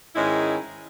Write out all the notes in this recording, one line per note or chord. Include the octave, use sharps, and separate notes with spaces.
G#2 D#3 G#3 C#4 E4